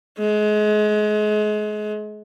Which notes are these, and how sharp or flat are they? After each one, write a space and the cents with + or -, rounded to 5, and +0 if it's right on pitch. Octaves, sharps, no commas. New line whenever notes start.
G#3 +30